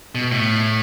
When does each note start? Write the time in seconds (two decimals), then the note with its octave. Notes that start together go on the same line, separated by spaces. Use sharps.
0.15 B2
0.32 A2